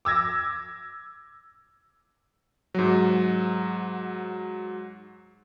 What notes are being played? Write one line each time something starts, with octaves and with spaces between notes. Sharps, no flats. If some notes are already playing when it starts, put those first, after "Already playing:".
D6 E6 G#6 A#6
G#2 F#3